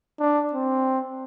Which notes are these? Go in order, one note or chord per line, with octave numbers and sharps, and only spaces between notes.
D4
C4